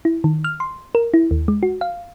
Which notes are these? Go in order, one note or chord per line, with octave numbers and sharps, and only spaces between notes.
E4
D#3
F6
C6
A#4
E4
D#2
G#3
F#4
F5